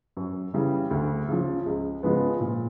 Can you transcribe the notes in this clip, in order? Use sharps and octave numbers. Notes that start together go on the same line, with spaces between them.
F#2
C#3 E3 G3
D2
C#3 F3
C#2
C#3 F3 G#3 B3
A#2